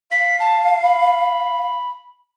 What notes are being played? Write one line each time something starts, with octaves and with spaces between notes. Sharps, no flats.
F5 B6
A5
B5